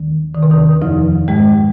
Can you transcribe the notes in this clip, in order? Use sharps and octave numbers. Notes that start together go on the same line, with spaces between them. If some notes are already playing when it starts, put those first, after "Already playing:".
Already playing: D#2 D#3
D#3
C3
D#2 D#3
F2 F3
G#2 G#3